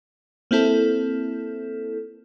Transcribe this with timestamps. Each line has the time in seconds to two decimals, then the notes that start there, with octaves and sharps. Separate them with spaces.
0.51 A#3 C4 E4 A4